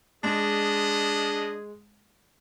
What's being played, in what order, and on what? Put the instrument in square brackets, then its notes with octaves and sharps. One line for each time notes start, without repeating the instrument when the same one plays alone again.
[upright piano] G#3 [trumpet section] B3 D#5 [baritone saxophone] D4 [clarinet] G#4